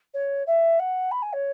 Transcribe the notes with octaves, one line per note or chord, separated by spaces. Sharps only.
C#5
E5
F#5
B5
G#5
C#5